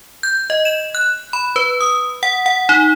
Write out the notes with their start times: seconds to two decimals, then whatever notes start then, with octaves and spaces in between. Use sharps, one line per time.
0.23 G6
0.50 D#5
0.65 E7
0.95 F#6
1.33 B5
1.56 B4
1.81 D#6
2.23 F#5
2.46 F#5
2.69 D#4